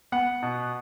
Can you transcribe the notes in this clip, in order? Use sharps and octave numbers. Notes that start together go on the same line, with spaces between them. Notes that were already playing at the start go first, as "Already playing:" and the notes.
B3 F#5
B2